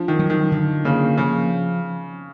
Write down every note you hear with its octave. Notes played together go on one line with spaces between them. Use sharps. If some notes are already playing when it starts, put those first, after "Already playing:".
Already playing: F3 D4
D#3
F#3
D#3
D3
C#3 A#3
C#3 F3